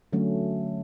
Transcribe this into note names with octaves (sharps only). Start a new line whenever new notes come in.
D3 F#3 A3 C#4